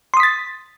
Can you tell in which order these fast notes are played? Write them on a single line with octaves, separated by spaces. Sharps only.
C6 D#6 B6 A6